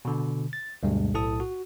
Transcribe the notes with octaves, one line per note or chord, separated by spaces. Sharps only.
B2 D3
A6
D2 G2 B2 G3 G#3
B1 A2 E4 A4 A5 D#6
F#4